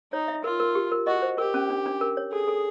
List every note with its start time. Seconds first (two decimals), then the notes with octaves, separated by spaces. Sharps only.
0.13 D#4 C#5
0.28 E5
0.44 F4 A#4
0.60 A#4
0.75 G4
0.92 A#4
1.07 F#4 D#5
1.22 C5
1.38 G4 A#4
1.54 C#4
1.70 D4
1.86 D4
2.01 A#4
2.17 C#5
2.32 G#4 A4
2.48 A4